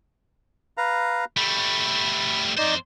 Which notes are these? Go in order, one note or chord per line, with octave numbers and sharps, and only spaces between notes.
B4 F5 A#5
G3 A3 B5
F2 D#4 C5 D5 D#5